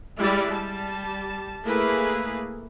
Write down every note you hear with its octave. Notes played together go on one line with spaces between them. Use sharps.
G3 G#3 E4 D5
G3 A5
A3 A#3 E4 G#4 B4